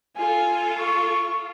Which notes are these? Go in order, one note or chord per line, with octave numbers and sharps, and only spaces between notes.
F4 A4 G#5
C#6